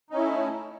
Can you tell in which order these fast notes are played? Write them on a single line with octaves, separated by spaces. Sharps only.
D#4 C#4 E4 A3